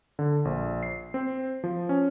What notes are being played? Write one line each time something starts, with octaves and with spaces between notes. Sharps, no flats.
D3
A#1
C7
C4
F3
C#4